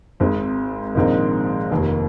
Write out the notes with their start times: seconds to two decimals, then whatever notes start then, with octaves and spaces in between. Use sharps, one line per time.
0.20 G#1 G#2 G#3 C4
0.95 A#1 G#2 D#3 C4 D#4
1.71 F1 D#2 D#3 A#3